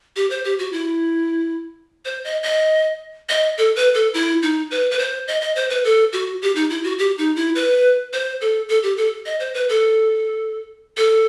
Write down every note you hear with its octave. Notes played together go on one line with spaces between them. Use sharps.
G4
C5
G4
F#4
E4
C5
D#5
D#5
D#5
A4
B4
A4
E4
D#4
B4
B4
C5
D#5
D#5
C5
B4
A4
F#4
G4
D#4
E4
F#4
G4
D#4
E4
B4
C5
A4
A4
G4
A4
D#5
C5
B4
A4
A4